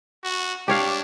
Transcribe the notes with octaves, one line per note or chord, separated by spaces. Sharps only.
F#4
D4 G4 C#5 F5